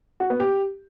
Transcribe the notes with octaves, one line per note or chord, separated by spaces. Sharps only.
F#4
B3
G4